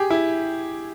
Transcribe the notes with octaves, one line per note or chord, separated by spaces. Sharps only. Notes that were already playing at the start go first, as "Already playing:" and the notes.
Already playing: G4 G#4
E4